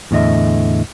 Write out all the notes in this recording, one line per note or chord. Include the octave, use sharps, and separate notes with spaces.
E2 A2 D3 D#5 E5